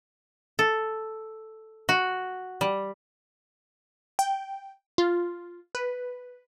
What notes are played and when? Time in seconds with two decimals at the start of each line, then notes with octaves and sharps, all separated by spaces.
0.59 A4
1.89 F#4
2.61 G3
4.19 G5
4.98 F4
5.75 B4